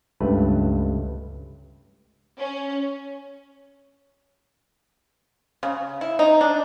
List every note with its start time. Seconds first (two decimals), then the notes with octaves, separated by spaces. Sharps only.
0.20 C#2 G2 A3 B4
2.38 C#4
5.63 C#3
6.01 E4
6.19 D#4
6.41 D4